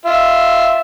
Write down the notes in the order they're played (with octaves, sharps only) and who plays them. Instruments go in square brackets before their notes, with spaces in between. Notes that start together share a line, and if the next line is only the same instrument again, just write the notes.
[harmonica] F4 E5